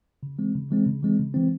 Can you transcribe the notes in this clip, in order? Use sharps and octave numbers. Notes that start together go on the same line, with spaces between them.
C#3
E3 G#3 C4
C#3
E3 G#3 C4
C#3
E3 G#3 C4
C#3
E3 G#3 C4